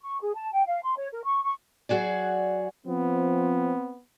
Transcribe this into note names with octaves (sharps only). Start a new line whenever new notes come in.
C#6
G#4
A5
G5
F5
C6
C#5
A#4
C#6
C#6
F#3 F#4 G#4 D5
F3 B3 C4